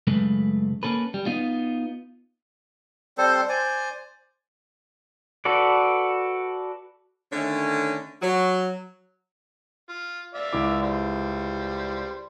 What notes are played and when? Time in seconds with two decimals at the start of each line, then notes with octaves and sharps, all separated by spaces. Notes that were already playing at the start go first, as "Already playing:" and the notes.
0.07 F#2 C#3 G#3 A3 B4
0.83 A#3 C#4 A4 B4
1.14 G3
1.26 B3 D#4 F4
3.18 G3 C4 A4 C5
3.49 C5 D5 G#5
5.45 F#4 A4 B4 D5
7.33 D3 D#3 A3 C#4
8.22 F#3
9.89 F4
10.34 D5 E5 F5
10.53 C#2 E4 D6
10.82 G3 C5